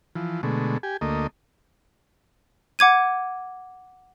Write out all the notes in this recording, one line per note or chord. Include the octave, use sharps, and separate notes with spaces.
E3 F3
B2 D3 G#3 A3
G4 G#5
D2 A3 A#3 D#5
F#5 D6 G#6 D#7